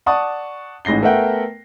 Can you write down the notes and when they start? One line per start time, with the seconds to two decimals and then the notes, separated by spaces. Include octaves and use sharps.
0.06 D5 F#5 A5 C#6 D#6
0.85 A1 G#2 A#6 C7 G7
1.03 A3 B3 A#4 E5 F#5 G5